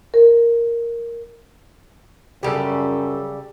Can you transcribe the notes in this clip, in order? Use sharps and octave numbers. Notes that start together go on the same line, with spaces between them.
A#4
F#2 C#3 G3 G4 A4